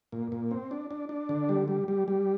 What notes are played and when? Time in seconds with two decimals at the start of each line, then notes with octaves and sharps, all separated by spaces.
0.12 A#2
0.32 A#2
0.51 C4
0.71 D4
0.91 D4
1.09 D4
1.29 D3
1.49 G3
1.68 G3
1.88 G3
2.08 G3